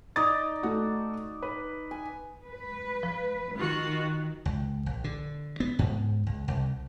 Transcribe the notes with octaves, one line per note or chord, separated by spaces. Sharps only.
D#4 D5 A6
A3 F#4
B4
G#5
B4
F3
D#3 F4 F#4
C#2
A#1
D3
B3
G#2
C#2
C2